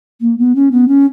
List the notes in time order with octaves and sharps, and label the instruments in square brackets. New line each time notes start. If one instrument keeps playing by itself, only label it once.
[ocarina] A#3
B3
C#4
B3
C#4